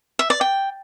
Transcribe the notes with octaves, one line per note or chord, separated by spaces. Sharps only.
E5
D5
G5